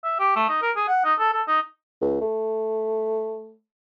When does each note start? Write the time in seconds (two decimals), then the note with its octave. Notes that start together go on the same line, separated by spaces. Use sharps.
0.04 E5
0.20 G4
0.36 A3
0.49 D#4
0.62 A#4
0.76 G#4
0.88 F#5
1.05 D#4
1.19 A4
1.33 A4
1.48 D#4
2.01 C#2
2.21 A3